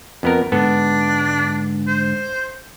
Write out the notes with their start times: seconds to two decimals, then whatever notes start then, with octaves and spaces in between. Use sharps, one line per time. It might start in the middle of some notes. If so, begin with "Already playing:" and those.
0.23 F2 B3 A#4
0.52 G#2 D3 G#3 B3 D4 A4
1.88 C5